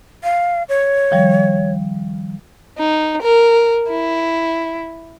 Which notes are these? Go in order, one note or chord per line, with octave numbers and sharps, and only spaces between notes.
F5
C#5
D#3 F3 G3
D#4
A#4
E4